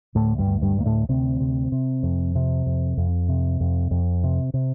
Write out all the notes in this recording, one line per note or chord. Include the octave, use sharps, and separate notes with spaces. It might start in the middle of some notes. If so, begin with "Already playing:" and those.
D2 A2 A3
G2 G3
D2
G2 G3
D2 A#3
A2 A3
D2 C3 C4
C3
C3
F2
C3
F2
F2
C3
F2
F2
C3
C3